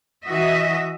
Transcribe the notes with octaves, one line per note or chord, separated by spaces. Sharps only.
E3 F#4 D#5 E5